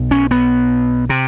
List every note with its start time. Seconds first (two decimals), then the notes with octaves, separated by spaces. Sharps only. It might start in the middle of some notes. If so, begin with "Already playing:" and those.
Already playing: B1 B2
0.11 C#4
0.31 B3
1.09 C3